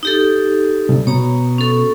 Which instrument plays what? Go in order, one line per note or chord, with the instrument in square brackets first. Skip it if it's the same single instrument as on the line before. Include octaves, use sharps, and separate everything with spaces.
[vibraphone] D#4 G4 A4
[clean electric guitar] C2
[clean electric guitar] B2 [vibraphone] C#5 A#5
[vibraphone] C#4 A4